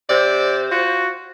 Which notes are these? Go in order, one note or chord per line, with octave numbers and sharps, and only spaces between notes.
C3 C5 D5
F4 F#4